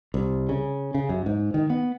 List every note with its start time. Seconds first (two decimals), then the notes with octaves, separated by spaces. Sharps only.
0.14 C2
0.49 C#3
0.94 C#3
1.09 F#2
1.26 G#2
1.54 D#3
1.70 B3